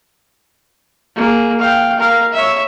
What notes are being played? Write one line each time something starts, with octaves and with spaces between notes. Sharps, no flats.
A#3 G#4
F5 G5
A#4 F5
C#5 E5